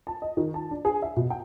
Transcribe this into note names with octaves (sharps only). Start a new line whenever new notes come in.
A5
D#5
D#3
A5
D4
G#4
E5
B2
G5